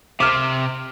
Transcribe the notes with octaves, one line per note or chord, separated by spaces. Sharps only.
C3 D6 F6